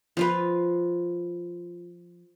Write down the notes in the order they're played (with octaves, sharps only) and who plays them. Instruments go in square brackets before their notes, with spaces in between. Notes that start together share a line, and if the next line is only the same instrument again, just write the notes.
[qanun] F3 F4 B4